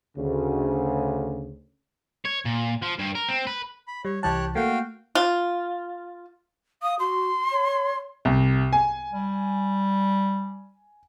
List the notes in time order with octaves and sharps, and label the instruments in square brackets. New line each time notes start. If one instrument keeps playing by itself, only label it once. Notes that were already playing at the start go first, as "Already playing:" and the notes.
[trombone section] D2 C#3
[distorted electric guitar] C#5
A#2
F3
G2
A#4
C4
B4
[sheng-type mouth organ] B5
[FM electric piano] G3 [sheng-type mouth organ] C#5
[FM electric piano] C2 E3 A5 [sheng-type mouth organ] G4 C#5 F#6
[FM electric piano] A3 A#3 [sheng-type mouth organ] F#4 F5 G5
[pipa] F4
[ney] F5 [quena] D#6
[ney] F#4 [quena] C6
[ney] C#5
[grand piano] C2
G#5
[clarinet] G3